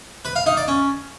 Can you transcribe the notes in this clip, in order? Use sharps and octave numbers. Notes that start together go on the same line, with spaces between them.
B4
F5
D#4
D5
C#4